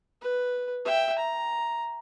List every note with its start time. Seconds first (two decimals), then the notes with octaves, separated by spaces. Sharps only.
0.22 B4
0.85 E5 G5
1.18 A#5